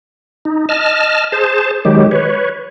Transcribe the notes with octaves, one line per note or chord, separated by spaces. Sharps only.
D#4
D#5 A5 F6
G#4 C5 A5
D#3 F#3 G#3 G4
B4 C#5